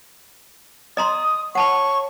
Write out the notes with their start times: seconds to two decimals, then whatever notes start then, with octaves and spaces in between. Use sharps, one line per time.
0.97 D#5 A#5 C6 D#6
1.55 C#5 F#5 A5 B5 C#6